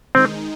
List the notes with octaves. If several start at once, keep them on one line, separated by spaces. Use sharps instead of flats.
D#3 G#3 C4 D#4